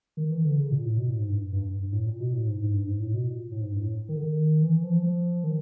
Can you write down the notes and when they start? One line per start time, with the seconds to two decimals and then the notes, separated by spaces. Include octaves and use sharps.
0.17 D#3
0.31 E3
0.45 D3
0.58 C#3
0.71 A#2
0.85 A2
0.98 B2
1.09 A2
1.19 G#2
1.29 G2
1.53 G2
1.66 G2
1.79 G2
1.92 A2
2.06 A#2
2.20 B2
2.33 A2
2.47 G#2
2.60 G#2
2.74 G2
2.87 G#2
3.00 A2
3.14 B2
3.28 A#2
3.51 A2
3.61 G#2
3.72 G2
3.81 A2
4.09 D#3
4.17 D3
4.22 D#3
4.62 E3
4.83 F3
5.03 F3
5.44 D#3